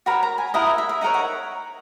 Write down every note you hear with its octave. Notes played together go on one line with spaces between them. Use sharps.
F#4 A#4 C#5 B5
A#5
G#5
E4 A#4 D#5 F#5
E5
E5
E5
D#4 A#4 C#5 F#5
F#5